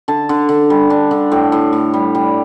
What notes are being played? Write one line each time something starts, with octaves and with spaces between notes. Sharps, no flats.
D3 A5
D3
D3
G3
D4
D3
A2 G5
A2
A2
G3
G3